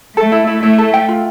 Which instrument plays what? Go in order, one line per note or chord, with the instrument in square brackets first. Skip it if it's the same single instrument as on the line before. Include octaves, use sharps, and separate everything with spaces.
[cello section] A3 [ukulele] A4
[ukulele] E4
E4
[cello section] A3 [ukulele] E4
[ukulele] A4
G5
F4